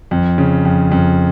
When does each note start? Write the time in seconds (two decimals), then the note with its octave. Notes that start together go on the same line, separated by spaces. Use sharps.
0.11 F2
0.38 C#3
0.65 F2
0.91 F2